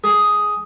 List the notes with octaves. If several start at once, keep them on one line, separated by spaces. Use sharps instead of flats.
G#4